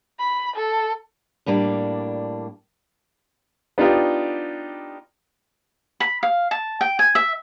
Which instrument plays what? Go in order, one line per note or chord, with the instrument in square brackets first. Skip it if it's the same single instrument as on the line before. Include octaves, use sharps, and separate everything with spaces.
[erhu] B5
A4
[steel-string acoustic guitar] A2 G3 A#3 D4
[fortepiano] B3 D4 D#4 F4 G4
[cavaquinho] B5
F5
A5
G5
G#5
E5